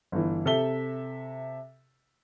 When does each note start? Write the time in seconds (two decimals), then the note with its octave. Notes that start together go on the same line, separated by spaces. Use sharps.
0.12 G1 E3
0.45 C3 A4 E5 G7